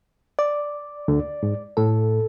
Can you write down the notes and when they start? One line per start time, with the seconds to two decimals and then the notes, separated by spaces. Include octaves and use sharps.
0.39 D5
1.08 D2 D3
1.43 G#2
1.77 A2 A4